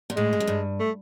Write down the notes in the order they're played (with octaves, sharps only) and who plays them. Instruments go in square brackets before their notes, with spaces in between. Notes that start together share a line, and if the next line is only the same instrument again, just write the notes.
[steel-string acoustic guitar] A#2
[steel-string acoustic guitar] A2 [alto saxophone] G#3
[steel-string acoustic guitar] G#2
F#2
G2
[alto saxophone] A3